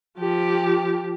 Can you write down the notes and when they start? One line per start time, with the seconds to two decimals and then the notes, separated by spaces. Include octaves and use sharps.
0.18 F3 G4